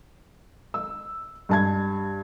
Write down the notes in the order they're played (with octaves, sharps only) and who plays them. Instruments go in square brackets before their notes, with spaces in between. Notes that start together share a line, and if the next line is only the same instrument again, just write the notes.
[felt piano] E6
G2 A5 G#6